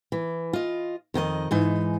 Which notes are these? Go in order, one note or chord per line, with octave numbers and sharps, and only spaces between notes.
E3
F4 D#5
F2 D#3 F#4 D#5
G#2 E3 D#4